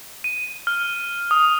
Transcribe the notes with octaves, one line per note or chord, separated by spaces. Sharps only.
D#7
F6
D#6